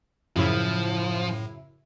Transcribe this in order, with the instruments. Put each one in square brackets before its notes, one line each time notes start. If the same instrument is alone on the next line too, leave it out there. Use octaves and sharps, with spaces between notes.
[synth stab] F#2 C#3 E4 [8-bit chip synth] A2 [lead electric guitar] F3